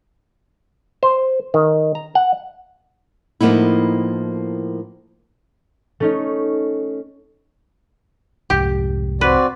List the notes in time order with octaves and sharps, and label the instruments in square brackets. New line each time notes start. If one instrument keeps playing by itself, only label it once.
[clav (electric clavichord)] C5
D#3
A#5
F#5
[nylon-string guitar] A2 F3 A#3 B3 D#4 E4
[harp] A3 C#4 D#4
[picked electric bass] C2 F2 G#2 [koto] G4
[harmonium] C4 F#4 D5 [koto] B4